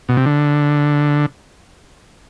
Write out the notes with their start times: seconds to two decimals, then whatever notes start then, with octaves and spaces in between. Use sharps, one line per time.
0.09 B2
0.17 C3
0.26 D3